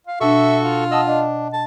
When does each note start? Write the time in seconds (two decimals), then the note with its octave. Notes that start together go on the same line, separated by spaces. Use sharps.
0.07 F5
0.21 B2 D4 F#4 A4 E5 C#6
0.63 F4
0.91 D#5 F#5 A5 D#6 E6
1.07 D4 D#5
1.53 A5